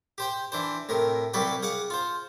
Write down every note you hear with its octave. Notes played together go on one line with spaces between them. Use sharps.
G4 C5 G5
E3 D4 C5
A2 C3 A#4
C2 F#3 G4 B4 D5 G5
G#4 F5 F#5 D6
F4 C5